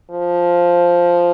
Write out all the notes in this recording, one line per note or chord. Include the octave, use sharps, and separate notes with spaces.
F3